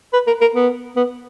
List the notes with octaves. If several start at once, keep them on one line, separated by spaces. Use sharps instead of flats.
B4
A#4
A#4
B3
B3